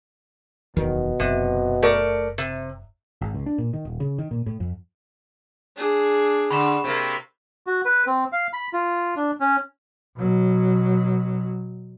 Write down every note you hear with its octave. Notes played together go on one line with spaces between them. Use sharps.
D1 E2 B2 D#3
F#1 C3
A3 A#4 D5
C3
G#1
C#2
D4
A#2
D#3
D#1
C#3
D#3
A#2
A2
F2
D4 G#4
D3 B5 C#6 E7
C3 A#3
F#4
B4
C4
F5
B5
F4
D4
C#4
B2 F#3